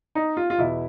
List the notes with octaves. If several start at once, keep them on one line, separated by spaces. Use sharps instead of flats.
D#4
F4
F4
E2 B2 E4